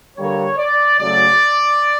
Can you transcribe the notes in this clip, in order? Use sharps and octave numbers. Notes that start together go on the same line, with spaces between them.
G2 D3 G3 A#3 C#5
D5
C#3 F#3 A3 D5